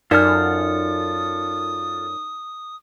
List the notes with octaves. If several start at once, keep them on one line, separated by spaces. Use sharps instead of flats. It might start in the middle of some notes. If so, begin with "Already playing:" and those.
F#2 D#4 F4 A4 A#4 D5 D#6 F6